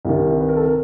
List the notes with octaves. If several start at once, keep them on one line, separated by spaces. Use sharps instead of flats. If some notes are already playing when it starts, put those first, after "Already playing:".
C2 C3 D#3 E4
B4
A#4
A4
A#4